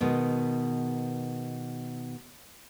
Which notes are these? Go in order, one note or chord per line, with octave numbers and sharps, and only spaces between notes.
B2 D#3 G#3 B3